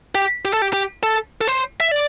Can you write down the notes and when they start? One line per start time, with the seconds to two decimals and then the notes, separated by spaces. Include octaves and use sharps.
0.15 G4
0.45 G4
0.53 A4
0.62 G4
0.73 G4
1.03 A4
1.41 A4
1.47 C5
1.80 E5
1.91 D5